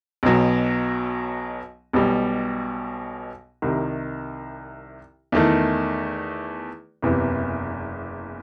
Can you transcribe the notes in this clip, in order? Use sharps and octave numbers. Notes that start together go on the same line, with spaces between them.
B1 B2 F#3
B1 B2 G3
C2 C3 D#3
E2 D#3 A3
F#1 E2 C3 E3